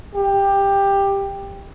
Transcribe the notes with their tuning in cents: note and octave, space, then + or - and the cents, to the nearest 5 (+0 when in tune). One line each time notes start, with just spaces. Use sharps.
G4 +15